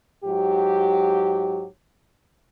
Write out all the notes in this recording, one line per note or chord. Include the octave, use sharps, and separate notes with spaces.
G#2 F#3 G4